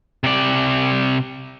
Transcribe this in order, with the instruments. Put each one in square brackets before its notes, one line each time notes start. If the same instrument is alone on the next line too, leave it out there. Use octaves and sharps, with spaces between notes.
[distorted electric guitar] C3 D5